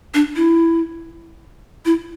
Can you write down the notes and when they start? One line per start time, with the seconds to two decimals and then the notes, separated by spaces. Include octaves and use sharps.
0.14 D4
0.36 E4
1.85 E4